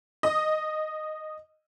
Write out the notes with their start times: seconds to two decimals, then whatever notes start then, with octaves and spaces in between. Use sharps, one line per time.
0.23 D#5 D#6